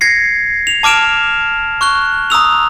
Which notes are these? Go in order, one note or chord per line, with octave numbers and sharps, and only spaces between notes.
G#6 A#6 C7 C#7
F7
A5 D6 F6 D7 E7 F7
C#6 F#6 G7
A#5 D#6 E6 F7